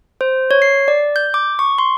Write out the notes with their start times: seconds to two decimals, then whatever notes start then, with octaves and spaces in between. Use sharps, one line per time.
0.21 C5
0.51 C#5
0.62 C7
0.88 D5
1.16 G6
1.34 D6
1.59 C#6
1.78 C6